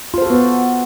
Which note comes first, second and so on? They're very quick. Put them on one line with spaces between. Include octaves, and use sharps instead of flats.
F4 C5 A4 F#4 B3